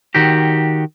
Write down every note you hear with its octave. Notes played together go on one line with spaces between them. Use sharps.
D#3 F#4 G4